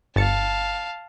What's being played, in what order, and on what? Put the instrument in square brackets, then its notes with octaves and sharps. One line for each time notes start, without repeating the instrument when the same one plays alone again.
[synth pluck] G1 A6 C#7 [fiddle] F5 A5